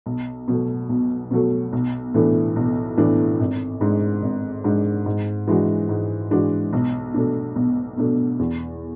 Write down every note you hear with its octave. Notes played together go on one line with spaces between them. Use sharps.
B1
B2 F#3 A3
B1
B2 F#3 A3
B1
A2 E3 A3 D4
B1
A2 E3 A3 D4
G#1
G#2 G#3 D4
G#1
G#2 G#3 D4
G#2
E3 G#3 D4 F#4
G#2
E3 G#3 D4 F#4
B1
B2 A3 D4
B1
B2 A3 D4
E2